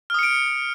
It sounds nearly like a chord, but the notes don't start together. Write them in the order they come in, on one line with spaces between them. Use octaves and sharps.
F6 D#6 C#7 D7